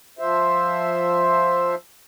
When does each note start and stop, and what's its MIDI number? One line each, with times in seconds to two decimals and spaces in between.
0.19 1.75 53
0.19 1.75 72
0.19 1.75 76